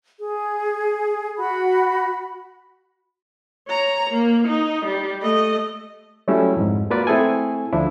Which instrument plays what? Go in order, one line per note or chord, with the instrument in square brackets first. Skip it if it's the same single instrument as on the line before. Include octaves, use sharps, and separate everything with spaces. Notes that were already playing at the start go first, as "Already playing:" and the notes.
[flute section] G#4
F#4 B5
[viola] C#5 A#5
A#3
D#4
G3
A3 D#5
[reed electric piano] F#3 G3 A3 C#4 E4
F2 G#2
A#3 F4 F#4 B4 D5
A3 C4 E4 G#4 A4 G#5
D2 F3 D4 E4